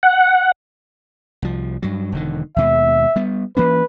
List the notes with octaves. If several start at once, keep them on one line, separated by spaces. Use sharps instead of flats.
F#5
C2 F3
G2 F#3
E1 D3 D#3
D#2 B2 G#3 E5
G3 B3
E3 A#3 C#4 B4